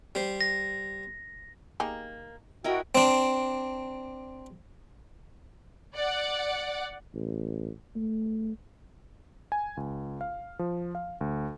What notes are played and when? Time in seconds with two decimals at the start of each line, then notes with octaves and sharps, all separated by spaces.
0.15 G3 C5
0.41 A#6
1.80 A#3 D#4 G4 G#4
2.64 E4 F#4 A#4 D#5 G5
2.95 C4 D4
5.95 D5 F#5
7.15 A1
7.96 A3
9.52 G#5
9.77 C#2
10.21 F5
10.59 F3
10.95 F5
11.21 D2